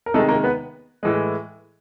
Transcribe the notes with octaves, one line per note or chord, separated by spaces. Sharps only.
A#4
C3 D#3 G#3 A3 A4
A#3 A#4
B3 B4
A2 E3 G#3